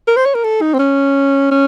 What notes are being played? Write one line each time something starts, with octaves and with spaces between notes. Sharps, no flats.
A#4
C5
C#5
A#4
A4
D#4
C4
C#4
C#4